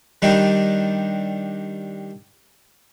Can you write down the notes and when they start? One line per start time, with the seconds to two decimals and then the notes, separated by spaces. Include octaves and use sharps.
0.22 D#3 G3 D4 D#4